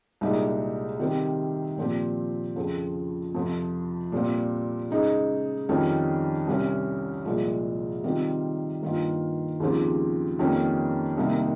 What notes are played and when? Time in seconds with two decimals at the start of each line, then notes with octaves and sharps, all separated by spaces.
0.21 C2 A#2 G#3 D#4 G4
1.00 C3 D#3 G3 C4 G4
1.78 A#2 F3 C4 G4
2.56 F2 C#3 F3 C4
3.34 F2 C3 F3
4.12 A#2 G3 C4 F4
4.91 C#3 G#3 D#4
5.69 F2 D#3 G3 C#4
6.47 C2 C3 G3 C#4
7.25 C2 A#2 F3 G#3
8.04 C3 D#3 G3 C4 F4
8.82 G2 D#3 A#3 F4
9.60 D#2 C#3 F3 C4 G4
10.39 F2 D#3 G3 A#3 C#4
11.17 C2 C3 D#3 A#3